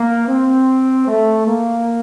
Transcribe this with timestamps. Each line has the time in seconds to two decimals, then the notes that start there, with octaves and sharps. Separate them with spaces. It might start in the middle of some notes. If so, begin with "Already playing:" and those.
Already playing: A#3
0.29 C4
1.08 A3
1.48 A#3